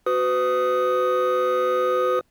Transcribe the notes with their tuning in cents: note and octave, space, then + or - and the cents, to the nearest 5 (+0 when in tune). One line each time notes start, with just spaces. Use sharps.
F#4 +0 B4 +40 D#6 +0